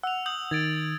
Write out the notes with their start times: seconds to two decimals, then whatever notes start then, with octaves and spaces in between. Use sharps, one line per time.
0.03 F#5 E6 F7
0.26 D#6 G6 F#7
0.51 D#3 G#6 A6 D7